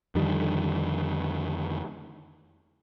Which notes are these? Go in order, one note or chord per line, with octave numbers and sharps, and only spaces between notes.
F2 D3 D#3 G3